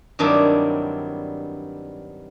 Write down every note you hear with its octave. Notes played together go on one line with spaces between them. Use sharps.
G2 D#3 F#3 C4 D4 E4